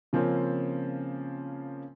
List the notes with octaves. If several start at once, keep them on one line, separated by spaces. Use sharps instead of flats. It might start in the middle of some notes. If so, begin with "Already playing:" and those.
C#3 F3 A#3 C4 C#4